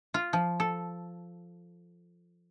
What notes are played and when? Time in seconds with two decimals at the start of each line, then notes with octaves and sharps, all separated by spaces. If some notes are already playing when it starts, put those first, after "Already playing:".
0.14 F4
0.33 F3
0.60 A4